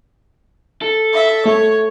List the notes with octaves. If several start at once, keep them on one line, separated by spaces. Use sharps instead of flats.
A4
E5
A3 C#5